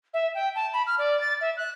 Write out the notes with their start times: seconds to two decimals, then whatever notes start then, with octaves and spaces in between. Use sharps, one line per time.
0.14 E5
0.35 G5
0.55 A5
0.73 B5
0.87 F6
0.98 D5
1.21 A6
1.41 E5
1.57 F#6